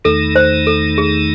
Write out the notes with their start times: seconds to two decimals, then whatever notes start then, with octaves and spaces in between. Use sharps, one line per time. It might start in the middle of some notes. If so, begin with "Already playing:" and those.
0.05 E2 D#3 A3 D#4 A4
0.36 C5
0.67 A4
0.98 G#4